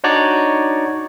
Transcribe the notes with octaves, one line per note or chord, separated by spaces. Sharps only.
D4 D#4 F#4 C#5 D5